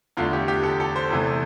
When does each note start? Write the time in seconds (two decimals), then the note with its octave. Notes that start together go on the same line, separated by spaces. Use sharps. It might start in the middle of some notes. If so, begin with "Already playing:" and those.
0.17 E2 D3 A3 F4
0.33 G4
0.48 G4
0.63 A4
0.80 A4
0.96 C5
1.11 E2 C3 E3 A3